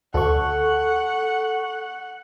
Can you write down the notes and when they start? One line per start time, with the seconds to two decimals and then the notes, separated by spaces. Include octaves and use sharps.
0.14 D2 A4 F#5 C#6